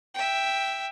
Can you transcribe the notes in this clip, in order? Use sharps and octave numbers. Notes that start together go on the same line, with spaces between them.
E5 G5